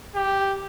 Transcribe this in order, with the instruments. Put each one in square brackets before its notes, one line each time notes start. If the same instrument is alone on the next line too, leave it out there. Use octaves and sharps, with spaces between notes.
[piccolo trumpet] G4